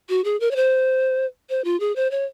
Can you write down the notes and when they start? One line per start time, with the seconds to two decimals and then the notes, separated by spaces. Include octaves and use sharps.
0.09 F#4
0.24 G#4
0.40 A#4
0.51 C#5
0.56 C5
1.50 C5
1.64 F4
1.80 G#4
1.96 C5
2.11 C#5